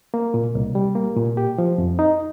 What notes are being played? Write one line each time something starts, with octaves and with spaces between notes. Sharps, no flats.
A#3
A#2
C2
G3
A#3
A#2
G4
F3
F2
D#4